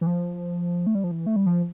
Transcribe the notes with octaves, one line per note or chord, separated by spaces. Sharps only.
E3
F3
A3
G3
F3
E3
A3
G3
F3